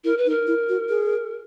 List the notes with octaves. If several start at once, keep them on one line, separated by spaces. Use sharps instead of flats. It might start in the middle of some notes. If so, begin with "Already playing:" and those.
E4 A#4
B4
D#4
A#4
E4
F#4
G#4